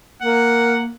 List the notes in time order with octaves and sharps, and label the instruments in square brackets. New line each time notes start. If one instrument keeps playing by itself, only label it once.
[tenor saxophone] A#3 [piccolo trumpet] F#5